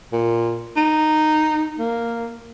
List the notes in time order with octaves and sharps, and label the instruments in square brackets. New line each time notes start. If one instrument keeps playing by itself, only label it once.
[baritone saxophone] A#2
D#4
A#3